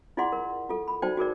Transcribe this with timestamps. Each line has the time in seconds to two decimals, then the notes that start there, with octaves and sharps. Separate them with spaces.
0.17 E4 F4 G#4 D5 F#5 C6
0.32 A#4
0.69 F4 A4
0.88 B5
1.02 D#4 F#4 C5 D5 G5 A5
1.17 F#4 G#4 A#4 D5